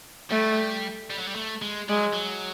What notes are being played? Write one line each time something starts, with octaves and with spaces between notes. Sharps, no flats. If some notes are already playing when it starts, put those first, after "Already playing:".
G3 A3
G3
F#3
G3
A3
G#3
G3 G#3
F#3
F#3